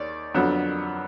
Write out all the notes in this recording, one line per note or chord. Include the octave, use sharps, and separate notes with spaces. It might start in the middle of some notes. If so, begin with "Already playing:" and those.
Already playing: D#2 D#3 C#5 D5
F2 D3 F#3 B3